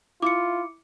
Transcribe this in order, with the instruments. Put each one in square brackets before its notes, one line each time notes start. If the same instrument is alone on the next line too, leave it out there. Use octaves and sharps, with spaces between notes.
[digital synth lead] E4 [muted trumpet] F4 [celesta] D6 C#7